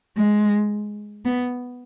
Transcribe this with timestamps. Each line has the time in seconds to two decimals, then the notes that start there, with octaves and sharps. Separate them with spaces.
0.17 G#3
1.25 B3